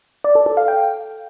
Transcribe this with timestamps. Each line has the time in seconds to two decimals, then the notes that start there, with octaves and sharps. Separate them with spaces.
0.24 D5
0.35 A4
0.46 A4
0.57 F5
0.68 G5